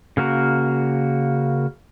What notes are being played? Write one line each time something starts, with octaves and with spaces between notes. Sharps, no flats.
C#3 A#3 F#4 A#4